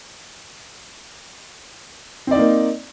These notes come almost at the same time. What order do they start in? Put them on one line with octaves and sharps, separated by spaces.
C4 D5 D#4 A#3